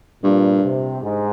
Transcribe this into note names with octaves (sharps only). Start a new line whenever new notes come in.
G2 A#2
C3
G#2